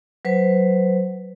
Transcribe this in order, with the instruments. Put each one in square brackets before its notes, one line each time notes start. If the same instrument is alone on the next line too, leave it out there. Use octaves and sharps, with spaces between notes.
[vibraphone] F#3 B4 C5